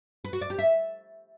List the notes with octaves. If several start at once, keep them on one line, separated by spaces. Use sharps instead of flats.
B4
F#4
D5
G4
E5